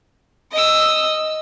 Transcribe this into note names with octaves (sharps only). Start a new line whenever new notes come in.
D#5 E6